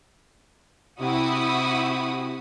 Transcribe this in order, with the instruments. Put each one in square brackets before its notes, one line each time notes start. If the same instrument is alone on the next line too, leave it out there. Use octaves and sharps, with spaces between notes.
[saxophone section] C3 [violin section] E4 F#4 D#6